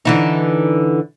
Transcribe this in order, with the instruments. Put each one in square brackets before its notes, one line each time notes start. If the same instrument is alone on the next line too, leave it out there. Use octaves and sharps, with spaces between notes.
[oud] D3 E3 D#4